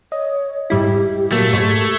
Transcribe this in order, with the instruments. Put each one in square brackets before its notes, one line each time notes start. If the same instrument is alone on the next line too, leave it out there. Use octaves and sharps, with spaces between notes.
[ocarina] C#5 [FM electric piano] D#5
[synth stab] G#2 G3 E4 [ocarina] G4
[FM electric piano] A#2 F#3 A#3 [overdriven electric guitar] A3
[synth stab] G#2 [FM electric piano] C#6 G#6